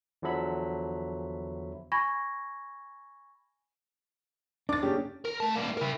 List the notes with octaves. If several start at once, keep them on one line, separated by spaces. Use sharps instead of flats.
E2 D3 F3 F#3 E5 B5
G#5 B5 C#6 G#6 A#6
D4 D6 A6
F#1 C#3 G4
A#4
A3 A5
G3 A#3
E4 A#4